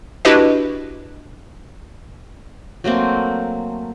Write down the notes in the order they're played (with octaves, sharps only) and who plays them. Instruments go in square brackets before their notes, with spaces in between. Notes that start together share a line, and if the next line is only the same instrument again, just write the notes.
[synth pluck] D4 E4 F#4 G4 B4 D#5
[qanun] F#3 A3 A#3 C4